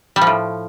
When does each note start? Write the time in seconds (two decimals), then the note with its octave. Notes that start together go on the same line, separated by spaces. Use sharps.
0.16 G3
0.21 F3
0.27 A2